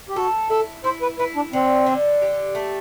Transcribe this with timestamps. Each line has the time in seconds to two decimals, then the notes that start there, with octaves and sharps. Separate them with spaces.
0.09 G4
0.16 F#4 A4
0.50 E4 A4
0.84 E4 C5
1.02 B4
1.19 E4 B4
1.36 D4
1.53 D3 C4
1.86 D3
2.22 G4
2.55 A3